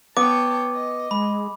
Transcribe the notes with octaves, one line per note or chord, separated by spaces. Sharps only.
B3 C#5 G5 A5 D6
D#5
G#3 B5